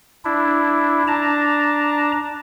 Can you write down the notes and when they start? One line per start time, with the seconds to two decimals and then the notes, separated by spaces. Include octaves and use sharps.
0.25 D4 E4
1.07 D4 A5 A#5